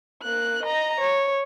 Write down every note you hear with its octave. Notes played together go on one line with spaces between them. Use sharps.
A#3 F#6
D#5 A#5
C#5